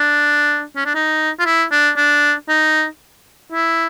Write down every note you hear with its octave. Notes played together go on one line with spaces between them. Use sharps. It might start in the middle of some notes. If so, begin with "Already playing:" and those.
Already playing: D4
C#4
D4
D#4
F4
E4
D4
D4
D#4
E4